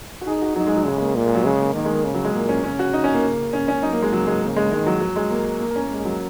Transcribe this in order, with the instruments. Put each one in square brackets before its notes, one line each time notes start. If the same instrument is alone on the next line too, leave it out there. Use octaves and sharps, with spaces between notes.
[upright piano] F#4
[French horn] D#4 [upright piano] G#4
[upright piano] F#4
[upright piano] F#3 [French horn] D#4
[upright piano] G#3
F#3
[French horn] C#3 [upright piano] G#3
[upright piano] G#3
A#3
[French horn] A#2 [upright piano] A#3
[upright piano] G#3
F#3
[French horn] C#3 [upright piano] G#3
[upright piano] A#3
[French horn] D#3 [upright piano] A#3
[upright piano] G#3
A#3
[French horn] C#3
[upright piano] F#3
G#3
[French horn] A#2 [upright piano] A#3
[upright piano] C#4
[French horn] C#3 [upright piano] C#4
[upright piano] F#4
D#4
C#4
A#3
[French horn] C#3
[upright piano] C#4
C#4
[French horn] F#3 [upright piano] D#4
[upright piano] A#3
G#3
[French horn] C#3 [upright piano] F#3
[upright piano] G#3
[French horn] C#3 [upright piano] A#3
[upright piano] G#3
[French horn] D#3 [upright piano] G#3
[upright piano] F#3
F#3
G#3
A#3
A#3
A#4
C#4
A#3
[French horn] G#3
[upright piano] F#3